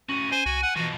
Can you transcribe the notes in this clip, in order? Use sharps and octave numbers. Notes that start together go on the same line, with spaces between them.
A2 C#4 F#4 D#7
C5 G#5
C2 F#4
F#5
B2 E3 F3 F#4